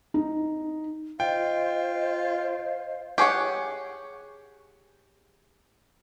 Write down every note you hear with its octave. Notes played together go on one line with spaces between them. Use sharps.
D#4
F4 C5 D#5 F5 G5
G4 G#4 C#5 F#5